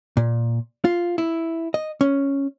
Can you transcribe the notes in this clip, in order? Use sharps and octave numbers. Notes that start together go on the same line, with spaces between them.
A#2
F4
E4
D#5
C#4